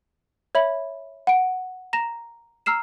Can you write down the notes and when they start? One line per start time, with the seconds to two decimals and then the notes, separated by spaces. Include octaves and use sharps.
0.55 C#5 E5 B5 F#7
1.27 F#5 D7
1.93 A#5 A#6 E7
2.66 A#5 E6 F6 C7 E7